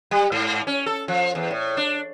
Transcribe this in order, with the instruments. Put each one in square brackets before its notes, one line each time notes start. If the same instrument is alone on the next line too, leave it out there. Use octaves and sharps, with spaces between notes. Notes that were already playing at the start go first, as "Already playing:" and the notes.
[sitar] G3
G#2
C#4
A4
F3
E2
A2
D4